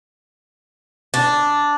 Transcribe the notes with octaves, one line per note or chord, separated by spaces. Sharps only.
D4